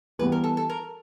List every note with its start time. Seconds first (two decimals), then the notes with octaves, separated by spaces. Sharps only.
0.19 E3 G3 B3 B4
0.32 A#4
0.44 A4
0.57 A4
0.69 A#4